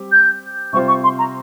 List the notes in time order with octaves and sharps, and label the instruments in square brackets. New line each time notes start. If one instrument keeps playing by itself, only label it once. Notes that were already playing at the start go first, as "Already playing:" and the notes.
Already playing: [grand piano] G3 C4 G4
[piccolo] G6
[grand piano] C3 G3 C4 F4 C5 [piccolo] C#6
[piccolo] C#6
C6
A#5